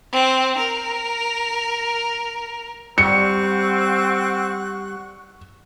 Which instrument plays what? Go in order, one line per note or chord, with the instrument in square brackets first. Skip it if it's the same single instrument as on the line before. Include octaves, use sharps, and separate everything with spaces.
[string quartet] C4
A#4
[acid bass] G3 [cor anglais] C4 [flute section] F#5 C#6 F#6 [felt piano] C#7